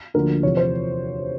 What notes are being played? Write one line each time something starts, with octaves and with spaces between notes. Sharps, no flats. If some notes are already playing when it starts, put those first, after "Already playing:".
D2 D3 F3 A#3 A#4
E2 C3 F3 C#5
C5